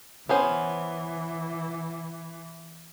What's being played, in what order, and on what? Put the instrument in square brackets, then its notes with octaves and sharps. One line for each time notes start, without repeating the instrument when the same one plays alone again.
[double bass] E3 [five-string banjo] B3 C#4 C5